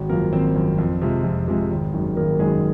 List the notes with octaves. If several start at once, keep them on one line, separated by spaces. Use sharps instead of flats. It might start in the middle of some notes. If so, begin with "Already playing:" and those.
Already playing: G#1 F#4
F#2 F3 A#3 A#4
G#1 C4 C5
F#2 F3
F2
C3 F3 G#3
F2
C3 F3 G#3
G#1
F#2 D#3 G#3
G#1 A#3 A#4
F#2 D#3 G#3 G#4